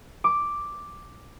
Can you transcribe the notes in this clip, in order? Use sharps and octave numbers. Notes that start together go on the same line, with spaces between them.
D6